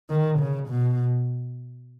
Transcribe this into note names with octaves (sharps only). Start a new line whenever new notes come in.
D#3
C#3
B2